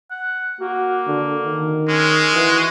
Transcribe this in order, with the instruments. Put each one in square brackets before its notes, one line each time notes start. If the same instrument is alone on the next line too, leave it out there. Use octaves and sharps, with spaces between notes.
[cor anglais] F#5
[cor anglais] A#3 [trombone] F#4
[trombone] D3
D#3
[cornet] G#3 [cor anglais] C#4
[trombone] E3 [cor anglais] F#4